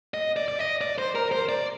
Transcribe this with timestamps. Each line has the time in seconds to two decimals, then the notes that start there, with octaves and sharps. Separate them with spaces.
0.14 D#5
0.36 D5
0.48 D5
0.59 D#5
0.81 D5
0.98 C5
1.15 A#4
1.32 C5
1.49 D5